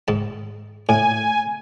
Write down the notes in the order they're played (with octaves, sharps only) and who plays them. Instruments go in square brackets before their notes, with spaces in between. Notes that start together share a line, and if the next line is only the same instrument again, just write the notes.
[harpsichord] G#2 A5
[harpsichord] A2 [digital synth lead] G#5